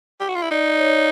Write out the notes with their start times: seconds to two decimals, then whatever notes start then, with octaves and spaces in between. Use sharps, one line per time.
0.20 G4
0.29 F#4
0.35 F4
0.42 E4
0.51 D#4 D5
0.77 C#5